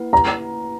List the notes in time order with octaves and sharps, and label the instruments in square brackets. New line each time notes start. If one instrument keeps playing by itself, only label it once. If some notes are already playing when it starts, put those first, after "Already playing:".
Already playing: [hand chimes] A#3 E4 B4 F#5
[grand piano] A#5